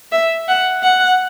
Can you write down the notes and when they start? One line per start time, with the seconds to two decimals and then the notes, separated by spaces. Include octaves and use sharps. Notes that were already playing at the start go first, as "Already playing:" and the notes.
0.12 E5
0.48 F#5
0.83 F#5